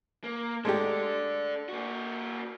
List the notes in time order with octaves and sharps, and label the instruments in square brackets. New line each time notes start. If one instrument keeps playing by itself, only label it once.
[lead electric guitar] A#3
[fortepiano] G#3 A3 G4 [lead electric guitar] D4 A4
[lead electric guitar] A#3 F#4